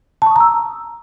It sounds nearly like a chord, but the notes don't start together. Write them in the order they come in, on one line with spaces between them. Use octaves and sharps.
A5 C#6 D#6 A#5 E6